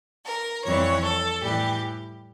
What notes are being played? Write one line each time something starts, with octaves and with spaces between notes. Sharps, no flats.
A#4
F2 E3 G3 C#5
A4
A2 E3 G3 G4